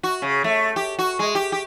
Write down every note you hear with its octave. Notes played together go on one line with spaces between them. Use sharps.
F#4
C#3
A3
G4
F#4
G#3
G4
G4